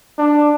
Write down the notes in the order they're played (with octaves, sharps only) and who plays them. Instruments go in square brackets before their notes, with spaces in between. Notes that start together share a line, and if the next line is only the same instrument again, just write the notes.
[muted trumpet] D4